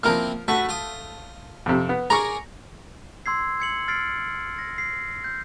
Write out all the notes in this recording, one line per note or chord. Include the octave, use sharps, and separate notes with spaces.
E3 F3 A#3 C4 A#4 F6
A3 F#4 B4 C#6
F4 D#6
F2 C3
B3
G#4 A#4 D5 A#5 C#6
C6 E6 G#6 C7
G#6 C#7 F#7
F6 A6 C7 D7
A#6
C7
G6